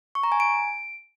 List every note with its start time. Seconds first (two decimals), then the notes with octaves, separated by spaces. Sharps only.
0.15 C#6
0.23 A#5
0.32 G#5
0.40 D7